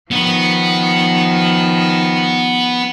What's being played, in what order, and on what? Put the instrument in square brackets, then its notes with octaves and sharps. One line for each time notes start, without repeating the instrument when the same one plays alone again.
[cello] D#3 F3 [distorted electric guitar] B3